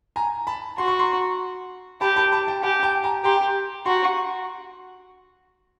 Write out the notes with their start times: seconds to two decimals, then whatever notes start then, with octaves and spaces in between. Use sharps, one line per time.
0.16 G#5 A#5
0.47 A5 B5
0.78 F#4 C6
0.88 C#6
0.99 A#5 C6
2.01 G4 A5 B5
2.16 A5 B5
2.32 A5 B5
2.47 G5 A5
2.63 G4 F#5 G#5
2.83 G5 A5
3.04 G#5 A#5
3.24 G4 A#5 C6
3.86 F#4 A#5 C6